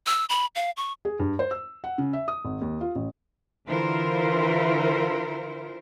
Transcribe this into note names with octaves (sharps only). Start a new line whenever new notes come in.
E6
B5
F5
C#6
G#4
G2
C5
E6
F#5
C#3
E5
D#6
G#1
D#2
F4
A1
D3 E3 E4 F4 A#4 C5